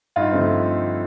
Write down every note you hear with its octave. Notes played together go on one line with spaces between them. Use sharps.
G2 D#4 F4
D3 F3 A3 C4